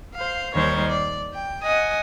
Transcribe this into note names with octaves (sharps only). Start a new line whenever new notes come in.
C5 F5
D#2 D#3 G3 C5 C#5 G#6
D5
G5
D#5 F#5 G#5 D#6